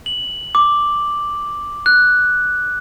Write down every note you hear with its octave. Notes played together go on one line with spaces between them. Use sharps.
F#7
D6
F#6